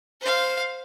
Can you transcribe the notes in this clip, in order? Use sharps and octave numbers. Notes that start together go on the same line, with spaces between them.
C5 F5